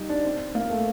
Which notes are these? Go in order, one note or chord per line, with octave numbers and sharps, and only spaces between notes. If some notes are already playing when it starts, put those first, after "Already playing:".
Already playing: G3 D#4
D4
C4
A#3
A3